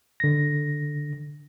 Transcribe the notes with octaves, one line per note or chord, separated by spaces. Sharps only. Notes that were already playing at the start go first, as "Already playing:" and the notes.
D3 A#6